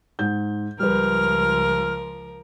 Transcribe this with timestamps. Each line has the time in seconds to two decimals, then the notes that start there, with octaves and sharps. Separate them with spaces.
0.19 G#2 G6
0.79 C#2 F3 G3 A#4 B4 F6